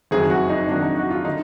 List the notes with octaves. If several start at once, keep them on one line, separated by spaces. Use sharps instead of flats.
F#1 F2 D#3 F#3 G#4
F#4
D#4
F#1 F2 D#3 F#3 D4
D#4
F#4
F4
D3 D#4